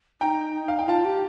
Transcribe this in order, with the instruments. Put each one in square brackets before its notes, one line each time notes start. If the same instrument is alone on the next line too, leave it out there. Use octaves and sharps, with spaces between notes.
[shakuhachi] D#4 [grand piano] G5 A#5
[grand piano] F5
G5
[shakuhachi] F4 [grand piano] F5 A5
[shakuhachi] G4